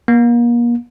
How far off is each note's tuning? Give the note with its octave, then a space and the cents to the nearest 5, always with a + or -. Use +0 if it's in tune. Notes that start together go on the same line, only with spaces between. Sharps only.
A#3 +35